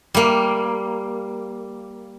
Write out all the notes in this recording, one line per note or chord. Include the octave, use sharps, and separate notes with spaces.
G3 A#3